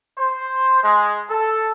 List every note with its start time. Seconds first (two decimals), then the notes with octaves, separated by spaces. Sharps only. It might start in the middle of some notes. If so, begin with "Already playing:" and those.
0.17 C5
0.84 G#3
1.30 A4